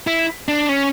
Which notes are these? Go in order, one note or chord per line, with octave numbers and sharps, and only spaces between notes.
E4
D4
C#4